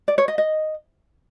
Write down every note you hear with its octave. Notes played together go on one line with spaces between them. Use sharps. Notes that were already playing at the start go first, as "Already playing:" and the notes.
D5
C#5
D#5
D#5